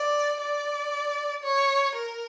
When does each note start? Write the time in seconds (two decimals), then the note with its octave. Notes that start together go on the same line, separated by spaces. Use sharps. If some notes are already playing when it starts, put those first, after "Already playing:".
Already playing: D5
0.41 D5
1.43 C#5
1.95 A#4